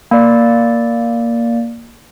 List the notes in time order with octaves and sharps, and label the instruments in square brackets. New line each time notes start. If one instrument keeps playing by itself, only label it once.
[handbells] A#3 D5